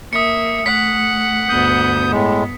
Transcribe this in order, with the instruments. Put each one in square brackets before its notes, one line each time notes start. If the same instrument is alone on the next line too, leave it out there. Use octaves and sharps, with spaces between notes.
[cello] A#3 [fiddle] E5 [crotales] D#6 C#7
[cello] A3 [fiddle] F#5 [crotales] B6
[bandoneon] D2 D#6 G6 [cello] G2 B3
[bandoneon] A2 G#3